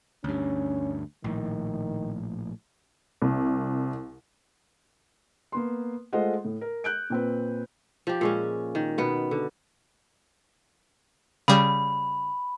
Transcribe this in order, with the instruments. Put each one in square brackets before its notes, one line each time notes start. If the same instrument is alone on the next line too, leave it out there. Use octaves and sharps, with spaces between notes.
[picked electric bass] D2 G2 [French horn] C#4
[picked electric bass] A#1 A2 [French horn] D#3
[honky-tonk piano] C2
[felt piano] A#3 B3 C6
G#3 A3 F4 C5 D#5 F#5
A2
A#4
F#6 G6 D7
A#2 C4 B4
[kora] F3 G4
A#2 G#3 C#4
D#3
B2 B3
D3
[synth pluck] C#3 G3 [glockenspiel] B5